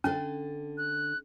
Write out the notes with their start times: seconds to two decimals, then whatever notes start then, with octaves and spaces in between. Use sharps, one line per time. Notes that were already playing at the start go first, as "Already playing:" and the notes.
0.04 D3 C#4 D4 A4
0.78 F#6